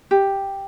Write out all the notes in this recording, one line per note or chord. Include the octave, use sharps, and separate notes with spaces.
G4